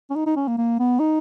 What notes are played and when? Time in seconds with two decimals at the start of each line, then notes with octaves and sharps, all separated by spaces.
0.10 C#4
0.16 D#4
0.26 D#4
0.37 C#4
0.48 A#3
0.58 A#3
0.79 B3
0.99 D#4